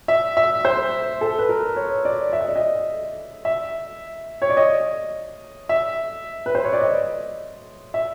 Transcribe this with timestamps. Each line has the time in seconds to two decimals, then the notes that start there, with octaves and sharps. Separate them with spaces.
0.08 E5
0.37 E5
0.65 C5
1.21 A4
1.39 B4
1.49 A#4
1.76 C#5
2.05 D5
2.33 E5
2.41 D#5
2.48 D5
2.56 D#5
3.45 E5
4.42 C#5
4.50 D5
4.57 D#5
5.69 E5
6.46 B4
6.55 C5
6.64 C#5
6.73 D5
6.82 D#5
7.94 E5